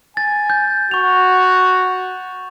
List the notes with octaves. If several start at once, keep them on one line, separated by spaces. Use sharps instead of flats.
G#5 A6
G6
F#4 C#6 F7